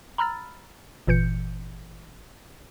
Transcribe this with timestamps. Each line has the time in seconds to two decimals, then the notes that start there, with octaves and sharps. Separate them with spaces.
0.18 A#5 B5 E6 F6 A6
1.07 G1 A#2 E3 G6 C#7